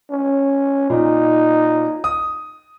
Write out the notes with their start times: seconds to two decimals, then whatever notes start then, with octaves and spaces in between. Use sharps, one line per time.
0.11 C#4
0.90 A#2 D#4
2.04 D#6